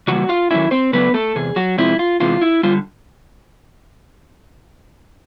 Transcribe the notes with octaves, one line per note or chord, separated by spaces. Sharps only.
C#3 E3 G3 A#3 F#4 F#5
F4 F5
D#3 F#3 A3 C#4 E4 E5
C4 C5
C#3 F#3 A3 B3 D4 B4
A3 A4
E2 C3 G#4
F#3 F#4
C3 F3 G#3 C4 E4
F4
E2 C3 E3 G#3 F4
E4
D3 G3 F4